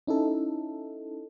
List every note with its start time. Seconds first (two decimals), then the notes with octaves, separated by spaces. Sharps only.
0.07 C#4 D#4 E4 A4